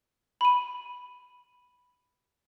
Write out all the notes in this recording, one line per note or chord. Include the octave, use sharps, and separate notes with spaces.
B5 D#7